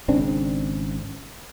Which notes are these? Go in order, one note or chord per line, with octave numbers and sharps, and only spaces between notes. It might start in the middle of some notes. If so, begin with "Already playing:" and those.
G#1 C#3 C4 D4